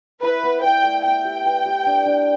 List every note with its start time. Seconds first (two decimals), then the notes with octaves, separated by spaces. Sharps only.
0.23 E4 B4
0.43 B3
0.64 D5 G5
0.84 A3
1.04 B3 G5
1.25 G4
1.46 B4
1.66 G4
1.86 D4
2.06 D4